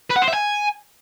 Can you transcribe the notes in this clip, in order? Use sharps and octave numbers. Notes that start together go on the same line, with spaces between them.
B4
F#5
C5
E5
G#5